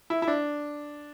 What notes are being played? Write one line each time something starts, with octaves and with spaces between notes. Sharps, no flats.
E4
E4
D4